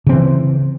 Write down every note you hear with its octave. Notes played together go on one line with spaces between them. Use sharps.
C#3 E3 C4